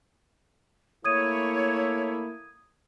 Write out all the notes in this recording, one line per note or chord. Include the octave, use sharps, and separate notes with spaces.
A3 A#3 E4 C#5 D#6 G#6 D#7